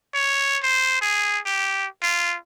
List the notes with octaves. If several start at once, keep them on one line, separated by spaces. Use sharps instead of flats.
C#5
C5
G#4
G4
F4